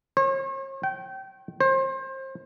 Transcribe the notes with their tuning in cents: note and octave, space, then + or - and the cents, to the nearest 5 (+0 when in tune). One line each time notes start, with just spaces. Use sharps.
C#5 -45
G5 -25
C5 +30